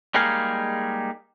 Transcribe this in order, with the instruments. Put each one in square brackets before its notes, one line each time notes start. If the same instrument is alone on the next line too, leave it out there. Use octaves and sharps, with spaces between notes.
[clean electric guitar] G3 G#3 A#3 D#4 G#4 F5